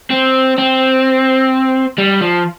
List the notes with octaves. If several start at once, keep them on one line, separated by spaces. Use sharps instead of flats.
C4
C4
G3
F3